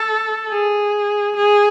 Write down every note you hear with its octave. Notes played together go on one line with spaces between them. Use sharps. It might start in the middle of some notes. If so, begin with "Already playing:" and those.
Already playing: A4
G#4
G#4